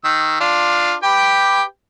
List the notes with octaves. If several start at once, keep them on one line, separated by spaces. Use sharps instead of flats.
D#3 E6
D4 F4
G4 B4 G5